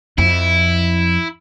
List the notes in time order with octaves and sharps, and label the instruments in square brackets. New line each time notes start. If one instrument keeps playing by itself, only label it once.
[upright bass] F2 [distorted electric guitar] E4